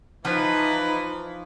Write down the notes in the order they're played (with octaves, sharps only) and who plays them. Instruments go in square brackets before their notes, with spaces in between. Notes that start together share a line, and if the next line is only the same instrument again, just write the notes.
[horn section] E3 B4 [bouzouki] F3 [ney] D#4